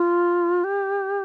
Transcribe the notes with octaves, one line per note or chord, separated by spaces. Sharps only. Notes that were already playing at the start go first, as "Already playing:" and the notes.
Already playing: F4
G4